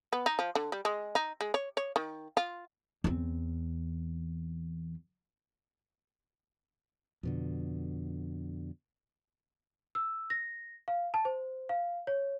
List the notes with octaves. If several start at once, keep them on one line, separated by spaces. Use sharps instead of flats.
B3
D#4
F3
D3
G3
G#3
D#4
G#3
C#5
C#5
D#3
F4
E2 C4
F2 B2 D3
E6
A#6
F5
A5
C5
F5
C#5